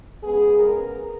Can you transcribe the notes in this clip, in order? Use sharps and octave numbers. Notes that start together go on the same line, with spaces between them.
C#3 G#3 B3 G#4
A#4